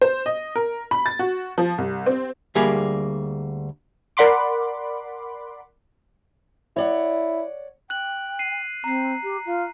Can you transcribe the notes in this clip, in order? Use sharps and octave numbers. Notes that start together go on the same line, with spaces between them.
C5
D#5
A#4
B5
A6
F#4
F3
C2
C4
D2 G3 A#3 G4 G#4 B5
A#4 D5 F#5 B5 C6 D6
E4 C#5 D5 F#5
G5 F#6 F#7
C7 D#7
C4 A#5 C7
G4
F4